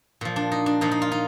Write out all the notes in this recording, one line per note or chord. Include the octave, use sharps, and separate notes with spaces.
A#2 F3
D4
D#4
D4
A#2 F3 D#4
D#4
F4
D#4